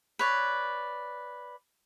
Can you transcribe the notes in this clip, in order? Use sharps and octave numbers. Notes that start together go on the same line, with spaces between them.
B4 C#5 D5